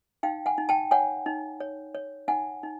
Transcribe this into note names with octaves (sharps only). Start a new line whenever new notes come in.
D#4 F5 G5
F#5 G#5
D#4
G5 A5
C#5 F#5 G#5
D#4
C#5
C#5
D#4 F#5 G#5
D#4